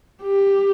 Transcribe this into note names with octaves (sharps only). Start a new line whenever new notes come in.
G4